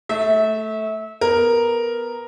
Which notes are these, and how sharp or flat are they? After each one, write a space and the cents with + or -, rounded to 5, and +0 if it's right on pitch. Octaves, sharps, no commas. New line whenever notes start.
A3 +0 E5 -25
B3 +0 A#4 +0